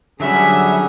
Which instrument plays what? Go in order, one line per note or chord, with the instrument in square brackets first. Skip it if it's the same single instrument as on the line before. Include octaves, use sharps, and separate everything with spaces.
[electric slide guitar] D3 F#3 G3 [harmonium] C#4 G#4 [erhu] E5